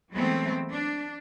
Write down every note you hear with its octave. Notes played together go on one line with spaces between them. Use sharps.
E3 F#3 G#3 A3 B3 C4
D4